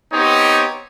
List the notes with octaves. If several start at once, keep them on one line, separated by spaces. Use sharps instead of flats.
B3 C4 D#4 G4 C#5